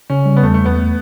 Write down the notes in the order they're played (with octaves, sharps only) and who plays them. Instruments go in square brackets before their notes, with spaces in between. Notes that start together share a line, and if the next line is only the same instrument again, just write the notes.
[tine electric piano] C#3 [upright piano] C#4
[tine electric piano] G3
[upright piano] B3
[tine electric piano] E2 [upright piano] A3
[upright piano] A3
[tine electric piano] E2
[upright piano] B3
[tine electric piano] A3